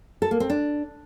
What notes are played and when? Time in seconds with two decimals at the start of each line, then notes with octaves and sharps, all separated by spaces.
0.22 A4
0.31 A#3
0.40 C4
0.50 D4